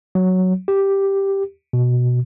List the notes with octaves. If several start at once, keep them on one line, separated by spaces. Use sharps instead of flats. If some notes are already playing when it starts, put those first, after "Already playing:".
F#3
G4
B2